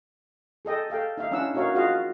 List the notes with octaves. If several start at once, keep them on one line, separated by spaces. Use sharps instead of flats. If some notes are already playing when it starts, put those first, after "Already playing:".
G#4 A4 D#5 G5
A4 F5 G5
D#4 E5 F5
C#4 D4 E4 F#5 E6
D4 D#4 F#4 A#4 C#5 F5
F4 F#4 G#4 D#5 F5